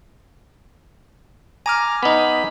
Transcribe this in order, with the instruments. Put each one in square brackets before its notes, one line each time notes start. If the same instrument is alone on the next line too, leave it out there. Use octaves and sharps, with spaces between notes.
[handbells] G#5 D6 F6 [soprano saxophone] A#5
[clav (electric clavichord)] B3 D#4 [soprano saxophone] B5